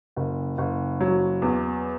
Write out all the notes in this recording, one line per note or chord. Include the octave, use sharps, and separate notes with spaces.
F#1
F#1
F#3
E2